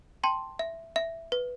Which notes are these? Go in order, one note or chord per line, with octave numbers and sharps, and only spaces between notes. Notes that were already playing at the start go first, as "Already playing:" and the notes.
G5 A5 C6
E5
E5
B4